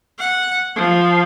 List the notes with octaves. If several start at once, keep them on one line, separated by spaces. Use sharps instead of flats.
F#5
F3